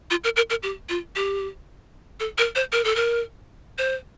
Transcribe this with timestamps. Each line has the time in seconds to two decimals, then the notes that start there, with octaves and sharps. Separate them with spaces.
0.11 F4
0.24 A#4
0.36 A#4
0.50 A#4
0.63 G4
0.89 F4
1.16 G4
2.20 A4
2.38 A#4
2.55 C5
2.72 A#4
2.85 A4
2.96 A#4
3.78 C5